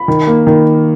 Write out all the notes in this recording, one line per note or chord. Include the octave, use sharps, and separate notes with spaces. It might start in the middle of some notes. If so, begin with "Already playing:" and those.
Already playing: B5
D#3
A#3
D#3